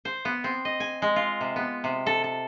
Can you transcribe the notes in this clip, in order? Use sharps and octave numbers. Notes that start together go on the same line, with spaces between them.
C5
B3
C4
D#5
G#5
G#3
F4
C3
B3
C3
A4
A4